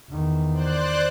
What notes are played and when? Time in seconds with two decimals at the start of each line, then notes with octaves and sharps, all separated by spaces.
0.10 E2 D#3
0.53 C5 D5 F#6